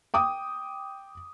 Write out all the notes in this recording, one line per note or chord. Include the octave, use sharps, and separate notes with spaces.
G5 D6 D#6